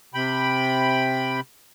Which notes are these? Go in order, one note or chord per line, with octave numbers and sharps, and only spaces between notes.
C3 G5 B5